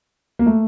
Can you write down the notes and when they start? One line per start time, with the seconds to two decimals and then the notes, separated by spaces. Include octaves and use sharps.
0.39 A#3
0.46 A3